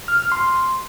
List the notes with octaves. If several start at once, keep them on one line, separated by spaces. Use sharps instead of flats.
F6
F6
C6